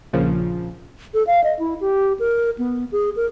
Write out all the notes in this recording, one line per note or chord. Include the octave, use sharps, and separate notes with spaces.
A#1 A#2 C#3 F3
A4
F5
D#5
E4
G4
A#4
B3
G#4
A#4